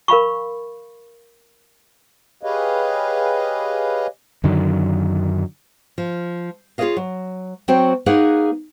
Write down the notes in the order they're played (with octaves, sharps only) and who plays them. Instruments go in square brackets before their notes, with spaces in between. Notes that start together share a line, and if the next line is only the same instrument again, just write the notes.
[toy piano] A#4 F5 B5 C#6
[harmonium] G4 G#4 B4 C#5 D#5 F5
[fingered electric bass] F#2 D3 D#3 F#3
[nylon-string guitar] F3
F4 G#4 B4 C#5 D#5 F5
F#3
F#3 C4 F#4 C5 G5
A#3 D#4 G#4 B4 C#5 F#5